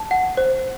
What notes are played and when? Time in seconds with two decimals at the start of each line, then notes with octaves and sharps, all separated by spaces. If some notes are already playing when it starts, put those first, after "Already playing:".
Already playing: A5
0.11 F#5
0.37 C5